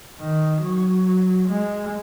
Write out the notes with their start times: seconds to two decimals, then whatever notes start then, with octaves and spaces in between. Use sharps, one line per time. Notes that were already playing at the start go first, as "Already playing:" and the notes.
0.20 D#3
0.62 F#3
1.48 G#3